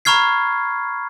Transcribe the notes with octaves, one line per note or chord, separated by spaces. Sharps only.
A#5 B5 C#6 F6 G#6 C7